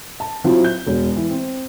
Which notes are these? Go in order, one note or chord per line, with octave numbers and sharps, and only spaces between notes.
A5
F#3 C4 E4 F4
G6
E1
E3
C4